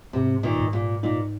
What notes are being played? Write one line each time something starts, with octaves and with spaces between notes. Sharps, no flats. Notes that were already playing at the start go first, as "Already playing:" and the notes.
G#2 C3
A#2 D#3
G#2
A#2
A#2 D#4